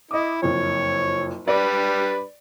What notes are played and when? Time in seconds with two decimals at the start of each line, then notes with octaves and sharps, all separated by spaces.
0.11 E4 D#5 D6
0.42 F#1 F2 C#5
1.48 G3 D4 B4 D5